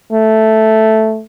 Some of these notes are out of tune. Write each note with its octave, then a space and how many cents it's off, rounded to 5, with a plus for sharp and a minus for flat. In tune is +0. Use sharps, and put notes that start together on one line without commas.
A3 -5